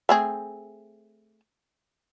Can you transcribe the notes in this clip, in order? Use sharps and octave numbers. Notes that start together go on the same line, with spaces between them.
A3 C4 G#4